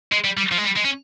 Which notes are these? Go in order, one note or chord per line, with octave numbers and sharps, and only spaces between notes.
G#3
G3
G3
F3
G#3
G3
G#3
C#4